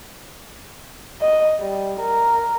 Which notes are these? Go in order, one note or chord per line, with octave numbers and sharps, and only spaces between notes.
D#5
G3
A#4